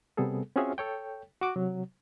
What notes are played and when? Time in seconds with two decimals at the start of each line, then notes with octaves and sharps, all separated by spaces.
0.17 C3 G3 B3 G#4 A4
0.56 C4 C#4 F4 F#4 G#4 E5
0.78 A4 C#5 G5
1.41 F#4 D6
1.56 C3 F#3